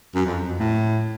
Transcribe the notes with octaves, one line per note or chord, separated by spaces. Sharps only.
F#2
F2
F2
A2